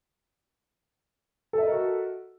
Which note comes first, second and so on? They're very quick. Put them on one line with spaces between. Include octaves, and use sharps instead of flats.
A4 E5 D#5 A#4 F#4